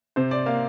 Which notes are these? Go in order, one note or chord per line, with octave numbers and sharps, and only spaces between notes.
C3 C5
D5
A#3 F5